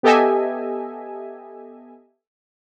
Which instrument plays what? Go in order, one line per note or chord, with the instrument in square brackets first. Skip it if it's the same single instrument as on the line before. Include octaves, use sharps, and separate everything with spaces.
[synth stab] B3 G4 A4 D#5 E5 G#5